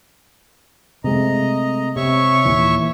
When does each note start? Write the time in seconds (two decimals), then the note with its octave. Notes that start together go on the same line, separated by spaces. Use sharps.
1.04 C3 G#3 A3 D#5 A#5
1.96 C3 C#5 E5 C#6
2.45 D#2 A#2 E3